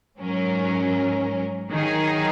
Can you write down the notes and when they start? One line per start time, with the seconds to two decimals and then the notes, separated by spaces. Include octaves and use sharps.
0.18 G#2 F#3 C#4 A#4
1.71 D#3 F#3 D#4 G#4